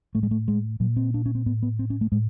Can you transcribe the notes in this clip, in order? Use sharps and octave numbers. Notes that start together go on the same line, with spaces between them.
A2 A3
G#3
A3
G#3
A#2 F#3
C4
D4
C#4
C4
A2 B3
B3
C4
C#4
A3
A2 G#3